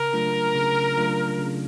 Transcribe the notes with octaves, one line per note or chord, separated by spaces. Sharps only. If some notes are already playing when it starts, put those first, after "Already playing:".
Already playing: C#3 A#4
F#3 A3 D4 F4
C#3
F#3 A3 D4 F4
C#3